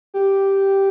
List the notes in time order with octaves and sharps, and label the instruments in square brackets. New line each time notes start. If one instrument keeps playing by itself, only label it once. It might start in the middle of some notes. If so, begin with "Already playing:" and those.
[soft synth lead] G4